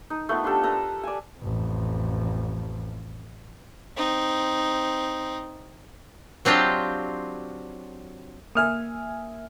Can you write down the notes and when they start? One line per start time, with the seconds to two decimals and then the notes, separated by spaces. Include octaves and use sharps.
0.10 D#4
0.29 A3 B3 F4
0.44 D4 F4 G4 A4
0.63 A4 B4 A#5 D#6
1.03 D5 G#5
1.39 A1 F2
3.97 C4 D#4
6.45 F#3 C4 D4 F4 G4
8.55 A#3 E5 G#5 D#6 F6